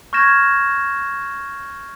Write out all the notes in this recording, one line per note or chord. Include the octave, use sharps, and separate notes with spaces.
C#6 F6 G6 G#6 A#6 E7